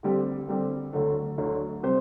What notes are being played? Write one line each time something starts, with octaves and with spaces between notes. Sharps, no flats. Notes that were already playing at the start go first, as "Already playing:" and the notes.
D3 G3 C4 G4
D3 G3 C4 G4
D2 D3 F#3 A3
D2 D3 F#3 A3
C3 G3 C4 G4 C5